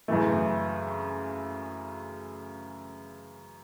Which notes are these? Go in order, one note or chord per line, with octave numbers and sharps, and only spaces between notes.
F#2 C#3 E3 A3